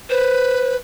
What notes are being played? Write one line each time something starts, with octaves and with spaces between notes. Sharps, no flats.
B4 C5